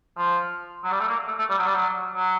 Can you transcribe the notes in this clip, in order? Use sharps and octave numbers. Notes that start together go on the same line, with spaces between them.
F3
F#3
G3
A3
A#3
A3
A3
G3
F#3
G3
F#3
F#3